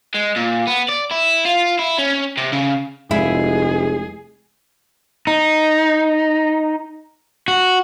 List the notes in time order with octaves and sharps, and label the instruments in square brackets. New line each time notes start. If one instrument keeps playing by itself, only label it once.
[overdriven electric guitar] G#3
A#2
B3
D5
E4
F4
E4
C#4
C3
C#3
[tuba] F1 [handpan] G#3 [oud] E4 [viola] G#4
[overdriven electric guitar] D#4
F#4